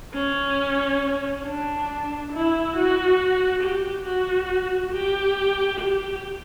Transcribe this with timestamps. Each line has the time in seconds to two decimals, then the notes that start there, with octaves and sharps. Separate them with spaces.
0.14 C#4
1.45 D4
2.32 E4
2.76 F#4
3.63 G4
4.05 F#4
4.94 G4
5.80 G4